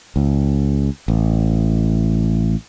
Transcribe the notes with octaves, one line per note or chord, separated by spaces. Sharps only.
C#2
A1